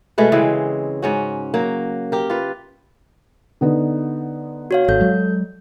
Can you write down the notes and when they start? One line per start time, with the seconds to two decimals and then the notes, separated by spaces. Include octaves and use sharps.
0.18 B2 G#3 A3 B4
0.32 C#3 E3 G#3 C4
1.02 G#2 C#4 F#4
1.54 F#3 A#3
2.12 G4 A#4
2.30 F4 B4
3.61 D3 B3 D#4
4.71 F#4 C#5 F5
4.88 G#1 A4 G6
5.01 F#3 G#3